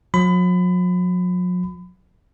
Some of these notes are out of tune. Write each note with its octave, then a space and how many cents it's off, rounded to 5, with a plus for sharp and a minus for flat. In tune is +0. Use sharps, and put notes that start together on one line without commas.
F#3 -45 B5 +25